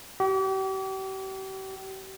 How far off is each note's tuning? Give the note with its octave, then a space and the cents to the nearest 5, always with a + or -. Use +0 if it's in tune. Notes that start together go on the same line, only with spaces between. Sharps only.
G4 -40